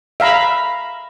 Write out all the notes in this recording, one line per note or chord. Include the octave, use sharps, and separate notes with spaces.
E5 F5 A#5 B5